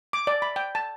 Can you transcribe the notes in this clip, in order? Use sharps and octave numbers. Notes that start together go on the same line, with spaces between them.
D6
D5
B5
G5
A5